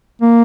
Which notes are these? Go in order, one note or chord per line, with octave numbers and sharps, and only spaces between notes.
A#3